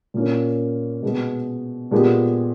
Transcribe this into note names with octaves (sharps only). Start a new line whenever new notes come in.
A#2 A#3 C#4
B2 G#3 B3
A#2 G#3 B3 G4